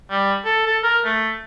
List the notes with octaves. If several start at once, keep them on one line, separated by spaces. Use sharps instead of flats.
G3
A4
A4
A#4
A3